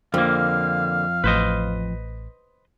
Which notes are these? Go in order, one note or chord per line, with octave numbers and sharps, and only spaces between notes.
F2 D3 A#3 F5
A1 B4 C5 D#5